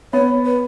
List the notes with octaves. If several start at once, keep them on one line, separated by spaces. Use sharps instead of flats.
B3 C#5
B4